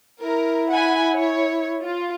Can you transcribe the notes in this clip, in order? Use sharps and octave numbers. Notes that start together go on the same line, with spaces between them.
E4 A#4
F#5 G#5 B5
C#5
F4